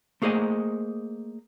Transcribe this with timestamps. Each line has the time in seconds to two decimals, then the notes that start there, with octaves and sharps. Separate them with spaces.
0.22 A3 A#3 G#4 C5 D#5